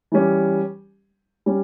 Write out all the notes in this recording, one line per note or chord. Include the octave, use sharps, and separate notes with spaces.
E3 G3 C#4 G4
G3 C#4